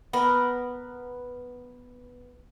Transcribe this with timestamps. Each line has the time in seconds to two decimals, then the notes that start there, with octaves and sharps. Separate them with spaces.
0.13 B3 A#4 B4